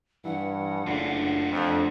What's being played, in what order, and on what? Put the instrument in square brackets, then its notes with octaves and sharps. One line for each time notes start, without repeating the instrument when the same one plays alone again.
[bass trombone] G2 [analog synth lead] E3 [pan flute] F#5
[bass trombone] F#1 [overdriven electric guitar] A3 F4 [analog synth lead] D4
[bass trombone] F2